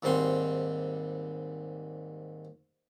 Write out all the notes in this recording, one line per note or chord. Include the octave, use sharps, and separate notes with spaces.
D#2 G#2 G3 C4 C6